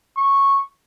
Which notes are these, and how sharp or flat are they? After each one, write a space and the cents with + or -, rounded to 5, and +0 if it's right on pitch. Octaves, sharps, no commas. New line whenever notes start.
C#6 -10